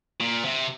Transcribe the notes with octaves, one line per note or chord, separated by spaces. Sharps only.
A#2
C3